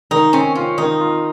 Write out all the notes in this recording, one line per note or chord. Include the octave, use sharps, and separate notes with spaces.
D#3 D#4
C4 C#4
C#4 F4
D#3 D#4
F4